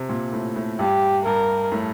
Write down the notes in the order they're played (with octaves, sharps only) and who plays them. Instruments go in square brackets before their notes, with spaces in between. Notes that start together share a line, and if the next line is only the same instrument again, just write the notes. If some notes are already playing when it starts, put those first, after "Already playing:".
Already playing: [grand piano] C3
A#2
A2
A2
[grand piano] G2 [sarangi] G4
[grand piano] G2 [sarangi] A#4
[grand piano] A2